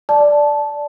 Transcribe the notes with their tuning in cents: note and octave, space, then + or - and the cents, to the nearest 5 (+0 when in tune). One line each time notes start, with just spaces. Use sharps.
D5 +0 A5 -10